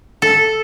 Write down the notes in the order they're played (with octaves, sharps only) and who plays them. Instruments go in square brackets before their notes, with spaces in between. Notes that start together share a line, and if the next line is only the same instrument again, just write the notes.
[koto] A4